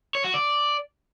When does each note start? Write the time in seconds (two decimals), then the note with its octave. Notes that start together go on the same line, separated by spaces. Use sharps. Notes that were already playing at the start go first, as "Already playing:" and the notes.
0.15 C#5
0.24 F#4
0.34 D5